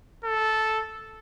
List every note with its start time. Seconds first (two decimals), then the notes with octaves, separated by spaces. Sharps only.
0.24 A4